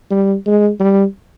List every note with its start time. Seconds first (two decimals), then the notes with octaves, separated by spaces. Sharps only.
0.11 G3
0.46 G#3
0.80 G3